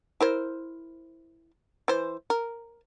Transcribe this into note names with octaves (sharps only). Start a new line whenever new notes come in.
E4 A#4 C5
E3 C5
A#4